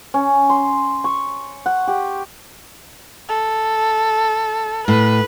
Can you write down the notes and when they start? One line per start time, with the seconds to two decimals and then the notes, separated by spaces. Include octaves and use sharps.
0.14 C#4
0.50 C6
1.04 C#6
1.66 F#5
1.88 G4
3.29 A4
4.88 A2 B4